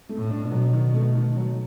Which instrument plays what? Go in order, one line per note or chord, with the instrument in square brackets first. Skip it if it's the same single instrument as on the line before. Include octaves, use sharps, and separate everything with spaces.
[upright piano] A3
[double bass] A2
[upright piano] D4
[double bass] B2
[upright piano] F#3
D#3
A3
D#3
F#3